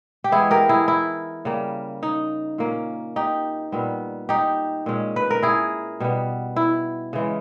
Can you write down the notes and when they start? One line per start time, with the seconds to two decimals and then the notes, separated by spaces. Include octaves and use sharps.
0.24 G4
0.32 E3 G#3 B3 E4 G#4
0.51 G4 A#4
0.69 E4 G#4
0.88 E4
1.45 C#3 G3 A#3
2.03 D#4
2.58 A#2 A#3 C#4
3.16 D#4 G4
3.72 A#2 G3 B3
4.29 D#4 G4
4.86 A#2 G#3 C#4
5.16 B4
5.30 A#4
5.42 E4 G#4
6.00 B2 G3 B3
6.56 E4
7.13 C#3 E3 G#3